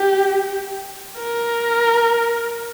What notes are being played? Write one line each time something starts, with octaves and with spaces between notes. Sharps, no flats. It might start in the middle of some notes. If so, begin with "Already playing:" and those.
Already playing: G4
A#4